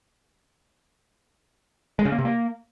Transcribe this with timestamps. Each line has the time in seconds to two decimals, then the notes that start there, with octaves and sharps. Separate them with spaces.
1.99 G#3
2.05 C#3
2.12 A#3
2.18 C3
2.25 A#3